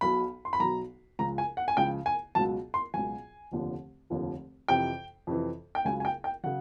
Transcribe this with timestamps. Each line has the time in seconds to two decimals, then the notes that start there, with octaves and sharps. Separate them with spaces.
0.01 B1 B2 F#3 B5
0.45 C6
0.53 B5
0.60 B1 B2 F#3 A#5
1.19 C#2 C#3 F3 A#5
1.38 G#5
1.57 F#5
1.68 G#5
1.77 C#2 C#3 F3 G5
2.06 G#5
2.35 C#2 B2 F#3 A5
2.74 C6
2.94 C#2 B2 F#3 G#5
3.52 F1 D#2 D3 F3
4.10 F1 D#2 D3 F3
4.68 F2 C3 E3 G5
5.27 F2 C3 E3
5.75 G5
5.85 C#2 C#3 F#3 G#5
6.00 G#5
6.05 G5
6.24 G5
6.43 C#3 F#3 F#5